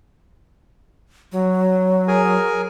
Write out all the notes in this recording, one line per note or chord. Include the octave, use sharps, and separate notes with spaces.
F#3
G#4 A#4 G#5